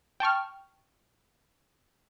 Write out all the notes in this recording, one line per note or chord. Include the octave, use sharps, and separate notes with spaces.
G5 A5 C#6 F6